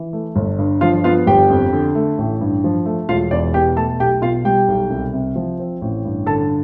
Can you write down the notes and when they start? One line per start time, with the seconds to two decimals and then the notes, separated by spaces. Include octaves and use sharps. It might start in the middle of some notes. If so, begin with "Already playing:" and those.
Already playing: E3
0.13 A3
0.36 G1
0.58 G2
0.81 F3 F4 F5
1.04 B3 F4 F5
1.27 G1 G4 G5
1.50 F2
1.73 D3
1.95 A3
2.18 A1
2.41 G2
2.64 F3
2.86 A3
3.09 E1 F4 F5
3.31 E2 D5
3.54 B2 G4 G5
3.76 A3 A4 A5
4.00 B1 G4 G5
4.22 B2 F4 F5
4.45 G3 G4 G5
4.68 B1
4.90 C2
5.13 C3
5.36 F3
5.59 C4
5.81 A1
6.05 G2
6.26 D3 A4 A5